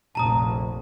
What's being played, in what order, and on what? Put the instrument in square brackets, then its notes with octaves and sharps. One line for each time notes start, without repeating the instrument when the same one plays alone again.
[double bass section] F1 A#1 [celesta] A5 A#5 D#6